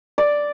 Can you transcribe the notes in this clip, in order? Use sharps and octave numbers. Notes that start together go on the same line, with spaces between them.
D5